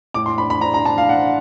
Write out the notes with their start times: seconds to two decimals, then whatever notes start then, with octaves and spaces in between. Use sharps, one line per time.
0.14 A2 D6
0.26 C6
0.38 D4 B5
0.50 B5
0.61 D4 A#5
0.74 A#5
0.85 D4 A5
0.98 F5
1.09 D4 F#5